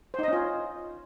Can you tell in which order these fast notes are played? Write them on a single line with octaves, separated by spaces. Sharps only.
C5 D#4 D#5 C#4 F4